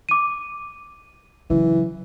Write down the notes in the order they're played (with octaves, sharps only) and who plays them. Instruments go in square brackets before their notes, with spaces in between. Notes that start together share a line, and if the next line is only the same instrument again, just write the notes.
[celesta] D6 D#7
[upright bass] C#3 F#3 [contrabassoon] E3